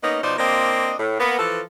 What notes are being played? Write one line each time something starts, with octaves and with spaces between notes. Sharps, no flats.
A#3 B3 C#4 D#4
B2 F3 D#4 C5 D5
A#3 C4 D4 F4 D#5
A2
A#3 B3
E3 F3 A4